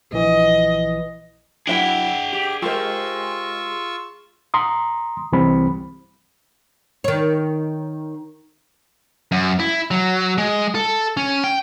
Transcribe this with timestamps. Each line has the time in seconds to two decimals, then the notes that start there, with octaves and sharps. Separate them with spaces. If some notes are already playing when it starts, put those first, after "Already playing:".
0.13 A#1 E3 D#5
1.67 F#3 D4 E4 G#4 E5 F#5 G5
2.33 G4
2.62 G#3 F4 G4 A#4 C5 C#6 E6
4.54 A#5 C6 D#6
5.32 C2 E3 G3 C4 B5
7.04 D#3 C#5
9.32 F#2
9.60 E4
9.91 F#3
10.38 G#3
10.75 A4
11.17 C#4
11.44 G5